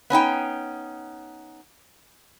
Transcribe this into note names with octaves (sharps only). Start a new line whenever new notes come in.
B3 C#4 D#4 G5